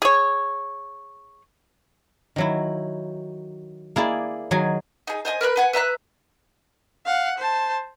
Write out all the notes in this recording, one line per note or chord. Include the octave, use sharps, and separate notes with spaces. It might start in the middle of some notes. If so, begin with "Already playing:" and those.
G#4 C#5
D#3 F#3 E4
A#3 E4 G#4 D5
D#3 F#3 G#4 G#5
D#4 G#4
C5 D#5 G5 G#5
A#4 B4 B5 F#6
B4 F#5 G#5
B4 E5 A#5 F#6
F5 F#5
C5 A5